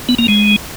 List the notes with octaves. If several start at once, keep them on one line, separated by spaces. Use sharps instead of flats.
B3
A#3
G#3